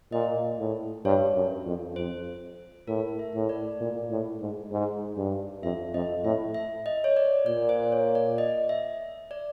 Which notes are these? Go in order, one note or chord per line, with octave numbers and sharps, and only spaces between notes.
A#2 D#5
A2
G2 C#5
F#2
F2
F2 C5
A2 A#4
E5
A2
D5
A#2
A2
G#2
G#2
G2
F2 E5
F2 D#5
A2 E5
E5
D#5
C#5
D5
A#2 D5
C5
C#5
D5
D#5
E5
D5